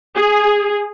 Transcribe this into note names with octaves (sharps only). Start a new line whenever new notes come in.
G#4